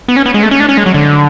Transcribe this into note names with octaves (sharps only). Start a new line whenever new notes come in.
B3
C#4
B3
G#3
A3
C#4
D4
C#4
G#3
F#3
D3